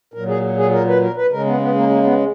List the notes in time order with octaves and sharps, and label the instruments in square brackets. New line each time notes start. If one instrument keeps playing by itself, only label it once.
[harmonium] A#2 F#3 A#4
G#4
G#4
A#4
B4
A#4
B4
C#3 G#3 A#4
B3
B3
A#3
A#3
B3